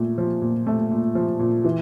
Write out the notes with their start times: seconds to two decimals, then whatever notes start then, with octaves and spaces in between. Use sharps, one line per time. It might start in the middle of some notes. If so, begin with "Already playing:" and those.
Already playing: A#2 A3
0.18 F3
0.42 A#2
0.67 A3
0.91 A#2
1.15 F3
1.39 A#2
1.64 E3